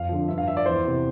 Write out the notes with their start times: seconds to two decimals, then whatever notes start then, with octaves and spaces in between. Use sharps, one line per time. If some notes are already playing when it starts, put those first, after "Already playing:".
Already playing: F2 F5
0.09 D3 F3
0.28 G2 E5
0.38 F5
0.47 F3 E5
0.57 D5
0.66 E2 C5
0.85 C3 E3